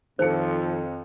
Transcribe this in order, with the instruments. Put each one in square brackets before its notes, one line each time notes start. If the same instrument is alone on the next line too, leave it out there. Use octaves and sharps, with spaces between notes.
[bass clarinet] F2 [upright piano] D#3 A4 C#7 [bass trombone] F3 [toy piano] C5